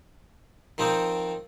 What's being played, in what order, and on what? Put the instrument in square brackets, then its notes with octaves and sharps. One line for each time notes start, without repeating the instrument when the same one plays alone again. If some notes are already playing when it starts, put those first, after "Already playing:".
[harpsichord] D#3 F3 C4 D#4